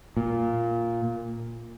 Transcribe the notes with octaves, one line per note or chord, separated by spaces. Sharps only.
A#2